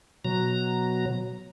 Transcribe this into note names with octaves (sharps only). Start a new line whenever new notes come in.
B2 F#3 A#5